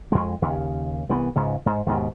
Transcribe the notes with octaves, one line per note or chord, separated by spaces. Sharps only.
F2 G#3
D#2 C#3
C2 E3 F3 B3
C#2 G#2 C#3
G#2
D#2 G#2 B2